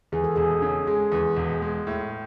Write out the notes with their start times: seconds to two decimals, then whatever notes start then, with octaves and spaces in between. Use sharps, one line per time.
0.12 E2 G#4
0.24 A4
0.36 E1 G#4
0.62 C#3
0.87 G#3 G#4
1.12 E2
1.37 E1
1.62 G#3
1.87 A2